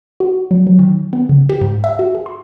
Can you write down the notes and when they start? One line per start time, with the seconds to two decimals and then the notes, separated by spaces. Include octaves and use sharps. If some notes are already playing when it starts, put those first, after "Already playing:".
0.20 F#4
0.51 F#3
0.67 F#3
0.79 D#3
1.13 B3
1.29 C#3
1.49 G4
1.61 G#2
1.84 E5
1.99 F#4
2.15 G#4
2.26 C6